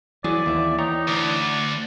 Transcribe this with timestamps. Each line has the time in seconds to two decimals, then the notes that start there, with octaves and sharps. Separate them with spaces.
0.24 E3 F#3 G#4 D5
0.46 D#2 B3 E5
0.79 D#4 C#5 G5 A#5
1.07 D2 D5